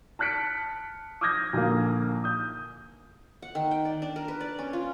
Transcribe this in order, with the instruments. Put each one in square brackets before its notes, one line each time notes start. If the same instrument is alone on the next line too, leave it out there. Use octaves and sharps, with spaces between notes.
[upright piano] A5 F6 F#6 B6 C#7 D7
D6 D#6 F6 G6 G#6 A#6
A#1 D3 A#3
D#6 G6
[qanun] F#5
D#3
G5
D5
D4
A#4
B4
D5
C#4
F4